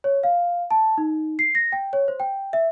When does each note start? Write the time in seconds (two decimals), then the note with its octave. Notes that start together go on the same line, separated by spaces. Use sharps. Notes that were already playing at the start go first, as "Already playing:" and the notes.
0.04 C#5
0.23 F5
0.71 A5
0.98 D#4
1.39 C7
1.55 A#6
1.72 G5
1.93 C#5
2.08 C5
2.20 G5
2.53 E5